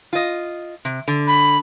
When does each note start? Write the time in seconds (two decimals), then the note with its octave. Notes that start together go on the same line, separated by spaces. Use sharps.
0.13 F4 D#5
0.85 C3
1.08 D3
1.27 B5